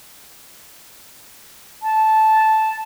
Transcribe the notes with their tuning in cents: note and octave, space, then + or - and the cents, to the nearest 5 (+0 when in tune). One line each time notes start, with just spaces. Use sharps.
A5 -10